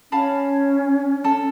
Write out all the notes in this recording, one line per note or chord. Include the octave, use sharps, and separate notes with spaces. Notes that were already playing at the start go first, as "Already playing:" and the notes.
C#4 F5 A5 B5
A4 A5